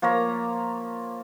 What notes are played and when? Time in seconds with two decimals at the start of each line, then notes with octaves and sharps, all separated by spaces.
0.02 F3 A#3 C#5 A#5